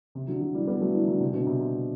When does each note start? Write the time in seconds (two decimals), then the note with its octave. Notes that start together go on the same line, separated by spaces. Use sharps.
0.15 C3
0.28 D3 F#3
0.41 D3 F#3
0.55 E3 G3
0.67 G3 B3
0.81 F#3 A3
0.95 E3 G3
1.07 D3 F#3
1.21 C3
1.34 B2 D3
1.47 C3
1.60 C3